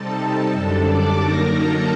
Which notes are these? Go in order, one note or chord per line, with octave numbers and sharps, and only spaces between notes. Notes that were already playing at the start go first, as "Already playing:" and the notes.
Already playing: C3 G3 C4 D#4 A4 A5
A4 A5
F#2 D3 G3 D4
D5 D6
D3 F#3 A#3 D#4 A#4 A#5
A4 A5